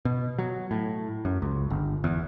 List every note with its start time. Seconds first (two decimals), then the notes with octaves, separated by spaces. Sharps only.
0.05 B2
0.38 F#3
0.71 A2
1.25 F#2
1.42 C#2
1.70 G1
2.04 E2